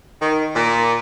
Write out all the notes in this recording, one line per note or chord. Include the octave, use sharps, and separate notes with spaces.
D#3
A#2